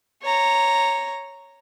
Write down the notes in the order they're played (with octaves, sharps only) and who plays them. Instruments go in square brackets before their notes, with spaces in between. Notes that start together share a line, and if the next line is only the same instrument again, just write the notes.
[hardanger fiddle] C#5 A#5